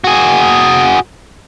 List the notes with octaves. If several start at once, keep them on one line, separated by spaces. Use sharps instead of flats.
F#4 G#4